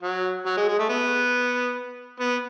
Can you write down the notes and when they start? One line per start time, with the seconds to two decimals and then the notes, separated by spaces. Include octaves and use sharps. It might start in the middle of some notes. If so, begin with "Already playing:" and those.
0.03 F#3
0.46 F#3
0.57 G#3
0.68 G#3
0.79 A3
0.89 B3
2.20 B3